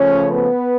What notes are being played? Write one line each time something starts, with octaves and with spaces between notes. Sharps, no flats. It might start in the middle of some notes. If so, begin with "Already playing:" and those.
Already playing: C#3 F3 A3 C#4 C#5
B3 B4